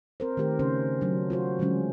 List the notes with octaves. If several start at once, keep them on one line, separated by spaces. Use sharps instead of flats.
C4 A#4 C5
D#3 A3 G4 A#4
C#3 C#4 C5
F#3 D4
F4 F#4 C5
D3 E3 F#3 G#3 C#4